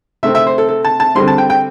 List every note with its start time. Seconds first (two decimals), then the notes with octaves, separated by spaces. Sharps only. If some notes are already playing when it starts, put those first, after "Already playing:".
0.23 C3 A3 C4 E5
0.35 E5
0.47 C5
0.58 A4
0.69 A4
0.85 A5
1.00 A5
1.15 D3 G3 C4 C6
1.28 A5
1.38 G5
1.50 G5